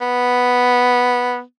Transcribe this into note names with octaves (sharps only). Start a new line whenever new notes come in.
B3